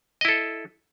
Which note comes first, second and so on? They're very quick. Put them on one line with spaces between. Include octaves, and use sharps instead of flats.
D#5 E4 A4